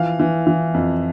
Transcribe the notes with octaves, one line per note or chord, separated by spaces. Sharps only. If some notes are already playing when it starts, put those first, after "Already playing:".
Already playing: E3 F3 F5
E3
E3
F2